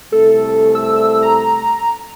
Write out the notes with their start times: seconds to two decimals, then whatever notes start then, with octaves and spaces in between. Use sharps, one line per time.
0.12 C2 A3 A4
0.75 E6
1.23 A#5